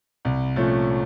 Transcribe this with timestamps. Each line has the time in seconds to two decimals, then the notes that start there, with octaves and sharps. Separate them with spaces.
0.25 C2
0.56 A#2 F3 A3 C#4